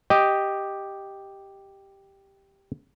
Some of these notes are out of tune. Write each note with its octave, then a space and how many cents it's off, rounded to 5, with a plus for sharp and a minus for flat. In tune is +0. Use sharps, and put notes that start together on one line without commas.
G4 +0 D#5 +0